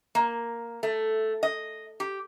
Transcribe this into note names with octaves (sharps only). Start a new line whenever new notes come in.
A#3
A3
D#5
G4